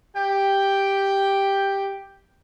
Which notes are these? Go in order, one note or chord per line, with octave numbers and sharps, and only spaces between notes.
G4 G5